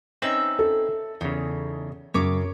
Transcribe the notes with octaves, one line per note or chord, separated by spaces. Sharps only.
C4 C#4 D#4 B4 E5 E6
A4
E2 C#3 D#4
F#2 C#3 C#5 D6